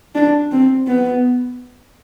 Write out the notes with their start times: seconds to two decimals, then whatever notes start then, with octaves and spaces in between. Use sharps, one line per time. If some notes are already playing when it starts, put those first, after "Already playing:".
0.15 D4
0.52 C4
0.87 B3